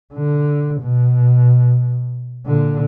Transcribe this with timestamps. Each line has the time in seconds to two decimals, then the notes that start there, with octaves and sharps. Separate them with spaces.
0.14 D3
0.81 B2
2.46 A#2 D3